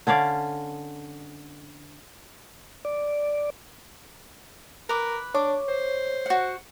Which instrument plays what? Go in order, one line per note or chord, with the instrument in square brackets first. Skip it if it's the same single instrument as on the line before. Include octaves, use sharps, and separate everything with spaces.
[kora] D3 C#4 D5 F5
[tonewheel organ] D5
[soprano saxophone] A#4 [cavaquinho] B4 D6
[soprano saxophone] D4 [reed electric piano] C#5 [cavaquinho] D6
[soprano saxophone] C5
[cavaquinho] F#4 F#5